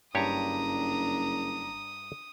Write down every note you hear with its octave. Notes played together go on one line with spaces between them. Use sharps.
F#1 G2 D4 G4 C#5 A#5 D#6